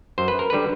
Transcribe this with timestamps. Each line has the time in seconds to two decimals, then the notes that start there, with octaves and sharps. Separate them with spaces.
0.18 F#2 C5
0.28 B4
0.39 A#4
0.50 D3 G3 B4